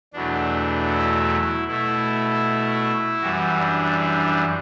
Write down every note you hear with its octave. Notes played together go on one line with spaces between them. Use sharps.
E2 B2 F#3 A3 D4
E4
B2 A3 E4
F#2 E3 G3 F#4
D4
D4